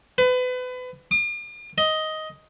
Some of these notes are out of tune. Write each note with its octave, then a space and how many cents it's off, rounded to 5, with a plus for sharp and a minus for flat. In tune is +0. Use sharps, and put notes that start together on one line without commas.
B4 +30
D6 +45
D#5 +10